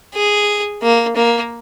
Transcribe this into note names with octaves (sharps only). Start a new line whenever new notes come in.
G#4
A#3
A#3